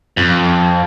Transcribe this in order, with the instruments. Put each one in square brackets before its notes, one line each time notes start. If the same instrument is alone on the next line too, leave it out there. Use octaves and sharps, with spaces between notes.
[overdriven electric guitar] F2